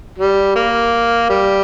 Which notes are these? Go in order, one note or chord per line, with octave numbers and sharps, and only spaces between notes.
G3
A#3
G3